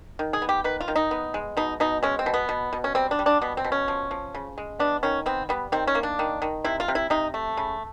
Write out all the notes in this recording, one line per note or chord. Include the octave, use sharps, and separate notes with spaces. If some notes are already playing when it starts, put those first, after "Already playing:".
D#3
G#4
B3
G4
D#3 B4
F4
D#3
D#4
B3
G#3
B2 D#4
B2 D#4
G#3 C#4
C4
B2
B3
B2
B2
C#4
G3 C4
D4
G3
D4
B2 B3
C4
B2
C#4
F3
F3
C#3
G#3
B3 D4
D#3 C#4
B3 C4
G3 B3
D#3 C4
C#4
A#3
D4
D#3
D#3
C3 E4
F4
C3
E4
C3 D#4
A3
C#3